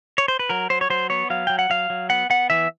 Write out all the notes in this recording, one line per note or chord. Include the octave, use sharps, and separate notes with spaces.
C#5
C5
B4
F#3 A#4
F#3 C5
C#5
F#3 C5
B3 C#5
F#3 F5
F#3 G5
F#5
F#3 F5
F#3
B3 F#5
B3 F#5
E3 E5